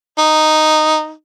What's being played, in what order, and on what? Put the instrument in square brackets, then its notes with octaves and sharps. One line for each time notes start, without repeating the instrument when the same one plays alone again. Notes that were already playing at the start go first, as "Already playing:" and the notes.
[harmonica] D#4